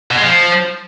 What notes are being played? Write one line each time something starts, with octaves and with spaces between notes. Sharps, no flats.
B2
G#3
F3